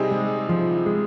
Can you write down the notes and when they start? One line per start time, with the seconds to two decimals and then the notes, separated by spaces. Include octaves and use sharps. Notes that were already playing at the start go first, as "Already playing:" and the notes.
Already playing: C3 G3 C4 D#4 G#4
0.11 G#3
0.49 F3
0.86 G#3